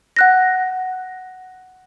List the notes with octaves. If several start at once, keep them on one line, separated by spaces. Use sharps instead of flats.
F#5 F#6 A#6